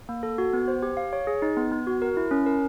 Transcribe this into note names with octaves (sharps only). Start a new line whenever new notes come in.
A#3
A4
F#4
B3
C5
G4
F5
C#5
G#4
D#4
B3
B3
F#4
A#4
E4
C#4
A#4